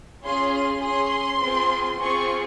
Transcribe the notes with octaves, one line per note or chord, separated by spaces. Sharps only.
C#4 F4 G#4 C6
C6
C#4 G#4 C6
C4 F4 G#4
C4 F4 G#4 C#6